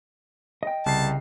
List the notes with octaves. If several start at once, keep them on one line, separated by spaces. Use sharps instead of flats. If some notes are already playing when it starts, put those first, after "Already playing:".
D#5 G5
C2 C#3 A5 C7